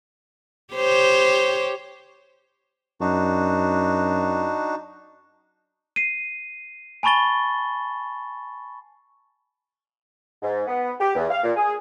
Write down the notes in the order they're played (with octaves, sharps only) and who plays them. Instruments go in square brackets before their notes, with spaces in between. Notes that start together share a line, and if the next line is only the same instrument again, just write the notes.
[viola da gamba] G4 C5 C#5
[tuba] F#2 [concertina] D4 D#4 F#4
[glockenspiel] C7 D#7
G#5 A5 B5 C#6 A6 G7
[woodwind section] G#2
B3
G4
E2
F5
A#2
G#4